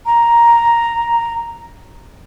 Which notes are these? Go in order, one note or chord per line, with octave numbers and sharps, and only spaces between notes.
A#5